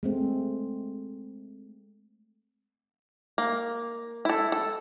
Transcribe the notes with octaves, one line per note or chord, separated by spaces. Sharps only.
G#3 A3 C4
A#3
E4 A4
A4